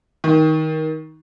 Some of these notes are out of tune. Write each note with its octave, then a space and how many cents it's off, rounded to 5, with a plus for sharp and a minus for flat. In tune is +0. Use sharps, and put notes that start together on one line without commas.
D#3 +15